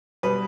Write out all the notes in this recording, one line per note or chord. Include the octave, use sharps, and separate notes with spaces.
B2 G3 B4